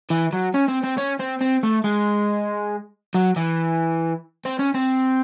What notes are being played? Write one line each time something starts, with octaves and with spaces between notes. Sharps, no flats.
E3
F#3
C#4
C4
C4
C#4
C4
C4
A3
G#3
F#3
E3
C4
C#4
C4